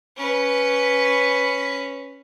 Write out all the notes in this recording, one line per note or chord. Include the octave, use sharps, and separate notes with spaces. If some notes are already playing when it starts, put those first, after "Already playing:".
C#4 B4